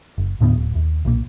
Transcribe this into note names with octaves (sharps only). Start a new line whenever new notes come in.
F#1
D#2 A2 D3 B3
D1
D#2
B1 A#2 A#3